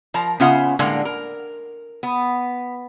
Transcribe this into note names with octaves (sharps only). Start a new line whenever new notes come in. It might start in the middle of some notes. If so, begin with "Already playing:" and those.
F3 A#4 A#5
C#3 B3 C#4 F4 E5 F#5
A2 D3 G#3 A#3
A#4
B3